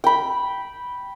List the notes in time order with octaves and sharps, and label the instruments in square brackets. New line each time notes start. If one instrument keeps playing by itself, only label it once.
[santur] G5 B5